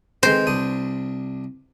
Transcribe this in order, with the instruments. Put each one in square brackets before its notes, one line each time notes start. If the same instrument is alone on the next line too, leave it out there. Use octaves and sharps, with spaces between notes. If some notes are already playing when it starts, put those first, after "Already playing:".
[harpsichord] D#3 G#3 C4 [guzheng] C5
[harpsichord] C2 D4 D#6